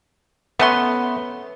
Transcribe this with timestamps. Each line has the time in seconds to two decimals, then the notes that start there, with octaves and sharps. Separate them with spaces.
0.59 A3 B3 C#4 C6